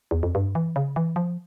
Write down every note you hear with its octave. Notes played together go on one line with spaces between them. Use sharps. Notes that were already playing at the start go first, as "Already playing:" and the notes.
E2
F2
G2
E3
C#3
E3
F3